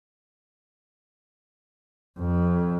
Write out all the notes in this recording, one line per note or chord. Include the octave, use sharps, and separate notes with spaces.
F2